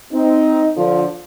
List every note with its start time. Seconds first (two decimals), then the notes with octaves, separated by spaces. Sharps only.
0.13 C4 D#4
0.76 D3 F3